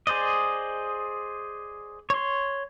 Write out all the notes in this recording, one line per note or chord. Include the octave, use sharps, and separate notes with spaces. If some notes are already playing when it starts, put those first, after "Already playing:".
G#4 C5 D5 D#5
C#5 C6